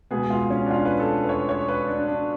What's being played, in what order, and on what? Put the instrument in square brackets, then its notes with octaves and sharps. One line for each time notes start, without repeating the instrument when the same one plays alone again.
[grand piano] C#2 B2 G#3 B3 G#4
F4
C#4
D4
F4
B4
A4
B4
C#5
C#5
B4
D4
D4